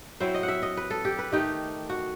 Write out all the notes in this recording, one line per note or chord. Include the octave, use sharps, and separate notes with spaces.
F#3 C4 E4 C5
D#5
F#5
E5
D#5
B4
A4
G4
B4
D#3 A3 D#4 G4
F#4